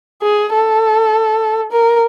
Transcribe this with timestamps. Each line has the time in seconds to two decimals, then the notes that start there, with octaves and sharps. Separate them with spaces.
0.22 G#4
0.53 A4
1.72 A#4